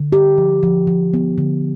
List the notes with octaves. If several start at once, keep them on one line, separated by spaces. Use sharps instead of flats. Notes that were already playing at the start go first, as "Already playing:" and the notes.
Already playing: D3
G4
F3
F3
F3
B3
D3